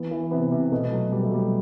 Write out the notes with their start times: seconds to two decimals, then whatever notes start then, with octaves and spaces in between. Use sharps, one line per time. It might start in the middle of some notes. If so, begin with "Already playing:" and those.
Already playing: E3 B3
0.11 E3
0.31 C3 B3
0.51 C3
0.71 B2 A3
0.92 F#3
1.12 B2 G3
1.23 A3
1.31 F#3 G3